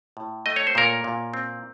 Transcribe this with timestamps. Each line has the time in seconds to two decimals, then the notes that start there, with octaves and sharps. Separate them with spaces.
0.17 A2
0.46 A3 D#5
0.56 C#5
0.67 C5
0.75 A#2 A#4 C#5
1.04 A#2
1.34 C4